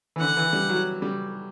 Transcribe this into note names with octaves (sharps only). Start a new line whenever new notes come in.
E3
D3 F#5
E3
G3
F#3
G3